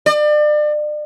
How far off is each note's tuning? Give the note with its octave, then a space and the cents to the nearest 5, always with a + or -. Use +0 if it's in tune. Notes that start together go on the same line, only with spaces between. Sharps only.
D5 +35